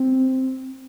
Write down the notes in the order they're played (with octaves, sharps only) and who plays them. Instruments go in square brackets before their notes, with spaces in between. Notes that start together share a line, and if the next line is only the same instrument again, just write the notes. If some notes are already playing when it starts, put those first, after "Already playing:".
Already playing: [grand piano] C4